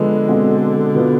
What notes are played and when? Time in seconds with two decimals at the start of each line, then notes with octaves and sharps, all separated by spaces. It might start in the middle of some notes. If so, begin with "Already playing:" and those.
Already playing: D3 F3 G#3 B3
0.27 B2 G#3 C4
0.95 B2 B3 F4